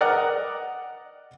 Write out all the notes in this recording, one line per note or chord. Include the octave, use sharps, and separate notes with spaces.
A#4 D5 D#5 F#5